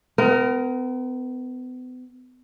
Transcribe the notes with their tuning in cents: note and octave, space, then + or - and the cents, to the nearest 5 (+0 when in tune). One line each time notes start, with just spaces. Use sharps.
B3 +40 A#4 +0